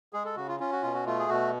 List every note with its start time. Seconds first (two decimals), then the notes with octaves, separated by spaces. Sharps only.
0.13 G#3 G#4
0.25 A4
0.37 C#3 F#4
0.48 F4
0.60 C#4 F4
0.72 F#4
0.83 B2 F4
0.94 F#4
1.06 A3 F4
1.19 G#4
1.29 B2 F#4